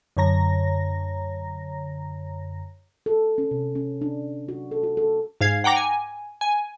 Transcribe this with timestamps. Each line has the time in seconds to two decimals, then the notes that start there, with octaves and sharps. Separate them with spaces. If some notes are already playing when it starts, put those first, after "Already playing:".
0.17 F#2 D3 C#5 A#5 A#6
3.06 A4
3.38 C#4
3.51 C3
3.75 C#4
4.01 D4
4.49 F#4
4.71 A4
4.83 F#4
4.97 A4
5.41 G#2 F5 G#6 C7
5.64 F#5 G5 A#5 D6 A#6
5.76 G#5
6.41 G#5